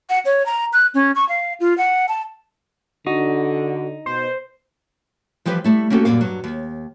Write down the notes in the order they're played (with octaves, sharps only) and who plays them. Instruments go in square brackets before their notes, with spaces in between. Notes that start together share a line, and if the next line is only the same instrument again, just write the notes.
[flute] F#5
C#5
A#5
F#6
C#4
C#6
F5
F4
F#5
A5
[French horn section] D3 [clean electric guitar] D#4 [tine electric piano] F#4
[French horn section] B2 [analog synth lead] C5
[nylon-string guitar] E3 F3 G3 G4 B4 F5
G3 A3 E4
A#3 C#4 E4 F#4 G4 A4
F#2 A#2 G3 A#3 F5
G2 F#3
D#2